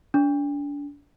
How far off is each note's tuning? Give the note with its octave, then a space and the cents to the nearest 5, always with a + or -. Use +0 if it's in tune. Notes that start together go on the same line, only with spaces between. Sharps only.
D4 -35